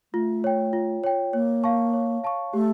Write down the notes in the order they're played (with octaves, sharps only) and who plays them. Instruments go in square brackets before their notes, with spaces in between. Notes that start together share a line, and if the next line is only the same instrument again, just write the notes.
[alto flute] A3 [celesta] F4
[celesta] C#5 G5
F4
C#5 G5
[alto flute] A#3 [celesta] C#5
[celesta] F5 A5 C#6
C#5
F5 A5 C#6
[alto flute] A3 [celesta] G4